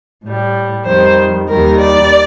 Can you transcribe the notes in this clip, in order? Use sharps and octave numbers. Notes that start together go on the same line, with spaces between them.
A2
G3
F2 D#3 G3 C5
D#2 D#3 G3 A#4
D5